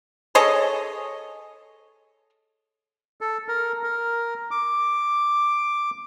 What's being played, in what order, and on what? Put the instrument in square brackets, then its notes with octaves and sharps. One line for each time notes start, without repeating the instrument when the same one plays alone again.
[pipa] G#4 A4 C#5 D#5
[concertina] A4
A#4
A#4
D6